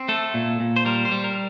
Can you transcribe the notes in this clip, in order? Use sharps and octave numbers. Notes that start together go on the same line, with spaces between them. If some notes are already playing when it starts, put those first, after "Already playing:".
Already playing: C4
A3 A4
A#2
A#2
C5
G3 A#4
C5
G3
A#4